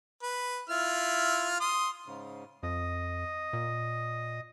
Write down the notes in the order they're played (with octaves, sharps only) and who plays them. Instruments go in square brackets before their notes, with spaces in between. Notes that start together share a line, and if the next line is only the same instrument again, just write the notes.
[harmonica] B4
E4 F4 F6
C6 D#6
[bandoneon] G#2 C#3
[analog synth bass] F2 [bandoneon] D#5 D#6
[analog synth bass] A#2